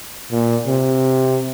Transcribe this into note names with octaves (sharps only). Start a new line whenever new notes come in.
A#2
C3